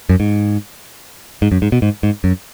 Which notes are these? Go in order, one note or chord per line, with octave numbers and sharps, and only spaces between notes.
F#2
G#2
G#2
F#2
G#2
B2
G#2
G#2
F#2